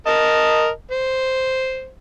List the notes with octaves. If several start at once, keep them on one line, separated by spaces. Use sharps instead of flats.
A#4 D#5 A5
C5